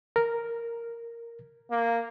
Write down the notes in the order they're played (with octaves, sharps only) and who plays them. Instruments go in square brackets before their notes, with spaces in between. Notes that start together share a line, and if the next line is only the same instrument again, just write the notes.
[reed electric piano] A#4
[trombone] A#3